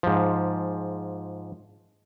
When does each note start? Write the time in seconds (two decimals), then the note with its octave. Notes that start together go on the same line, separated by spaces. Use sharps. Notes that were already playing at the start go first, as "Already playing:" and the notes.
0.03 G#2 F3